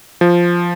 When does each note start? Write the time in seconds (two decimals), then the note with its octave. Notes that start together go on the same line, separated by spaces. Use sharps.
0.21 F3